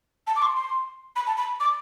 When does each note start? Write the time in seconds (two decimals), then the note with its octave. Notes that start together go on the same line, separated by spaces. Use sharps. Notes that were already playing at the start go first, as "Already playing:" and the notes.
0.27 A5
0.36 D6
0.42 C6
0.56 C6
1.16 B5
1.27 A5
1.37 B5
1.60 D6